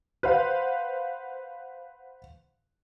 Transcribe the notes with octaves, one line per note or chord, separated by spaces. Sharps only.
B4 C5 F5 F#5